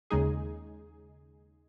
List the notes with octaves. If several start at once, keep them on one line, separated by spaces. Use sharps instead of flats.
D#2 C#3 G#3 D#4 G#4